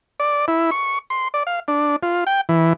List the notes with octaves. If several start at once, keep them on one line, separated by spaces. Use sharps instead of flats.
D5
E4
C#6
C6
D5
F5
D4
F4
G5
E3